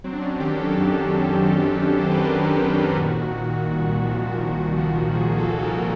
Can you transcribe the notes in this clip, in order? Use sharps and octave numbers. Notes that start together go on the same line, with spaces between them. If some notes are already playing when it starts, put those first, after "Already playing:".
F#3 C4
D4
C#4
D#3 G4
A4
F#2
F#3
F#3
F#2
C5
B4
D#3 A#4
A4
D#3
G4
A#2 F#4
A#2
C2
F3
A#2
F3
C2 G#4
A4
C2
A4
A#4